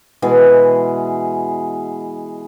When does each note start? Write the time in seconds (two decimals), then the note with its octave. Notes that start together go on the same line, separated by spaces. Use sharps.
0.22 B2 E3 G#3 G#4